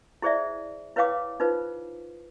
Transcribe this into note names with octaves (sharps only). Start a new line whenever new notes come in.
E4 G#4 C5 D5 E5
E4 B4 C#5 F5 G5 D6
D#4 F4 B4 C5